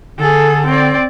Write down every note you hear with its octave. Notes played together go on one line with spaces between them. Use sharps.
D3 G#4 A4
C4 D5